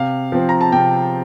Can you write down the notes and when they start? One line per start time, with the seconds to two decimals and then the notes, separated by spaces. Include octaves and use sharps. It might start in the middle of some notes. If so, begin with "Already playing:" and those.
Already playing: C3 F5
0.32 F3 C4
0.49 A#5
0.61 A5
0.72 C3 G5